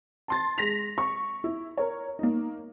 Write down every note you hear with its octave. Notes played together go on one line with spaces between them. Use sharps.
A5 C6 A6
G#3 A#6 B6 F7
C#6
E4
A#4 C#5
A#3 D#4